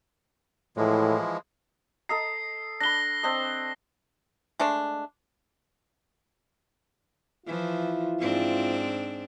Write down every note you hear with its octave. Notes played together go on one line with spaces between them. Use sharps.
A2 E3 F3 G#3
A4 D#5 A#5 C7
D4 B5 A#6 G7
C4 D4 D#5
G#3 A3 D4
E3 F3 E4 F4
G#2 C4 D4